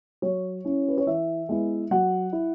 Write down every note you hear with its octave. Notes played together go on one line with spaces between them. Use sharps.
F#3 C#5
C#4 E4
B4
C#5
E3 E5
G#3 B3 E4
F#3 F#5
E4